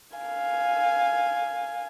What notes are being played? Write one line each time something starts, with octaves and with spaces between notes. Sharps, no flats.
F5 G#5